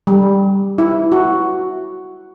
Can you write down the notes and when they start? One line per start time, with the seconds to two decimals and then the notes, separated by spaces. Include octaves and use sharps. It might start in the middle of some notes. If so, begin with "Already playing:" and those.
0.07 G3
0.78 E4
1.12 F#4